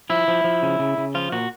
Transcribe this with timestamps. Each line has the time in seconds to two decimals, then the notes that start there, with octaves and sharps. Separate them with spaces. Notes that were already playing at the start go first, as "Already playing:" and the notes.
0.10 F3 E4
0.28 F3
0.44 F3
0.62 C#3
0.79 C#3
0.98 C#3
1.14 F3 F4
1.32 A#2 F#4